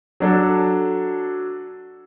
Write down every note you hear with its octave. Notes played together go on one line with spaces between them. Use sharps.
F#3 D4 A4